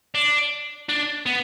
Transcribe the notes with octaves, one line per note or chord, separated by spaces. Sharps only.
D4
D4
B3